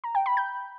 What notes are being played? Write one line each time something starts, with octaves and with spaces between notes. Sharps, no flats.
A#5
G5
B5
G6